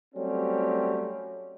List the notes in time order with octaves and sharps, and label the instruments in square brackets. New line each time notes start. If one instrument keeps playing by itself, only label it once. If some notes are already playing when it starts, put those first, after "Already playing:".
[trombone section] F#3 G3 A3 C4 C#4 G4